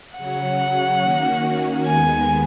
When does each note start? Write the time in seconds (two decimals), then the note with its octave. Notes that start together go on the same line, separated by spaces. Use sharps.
0.17 C#3 F#3 C#4 F#5
1.02 D#3 A#3 C#4 F#4
1.86 D#2 D#3 G#3 B3 G#5